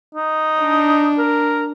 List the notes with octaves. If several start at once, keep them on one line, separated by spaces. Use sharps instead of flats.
D#4
D4
A#4